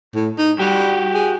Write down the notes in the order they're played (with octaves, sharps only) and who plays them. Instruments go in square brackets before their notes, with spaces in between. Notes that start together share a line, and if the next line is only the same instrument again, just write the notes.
[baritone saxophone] A2
D#4
[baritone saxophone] G3 [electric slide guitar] F#4 G4
[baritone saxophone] G#4